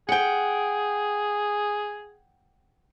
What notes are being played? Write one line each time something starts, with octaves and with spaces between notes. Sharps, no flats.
G#4 F#5 G5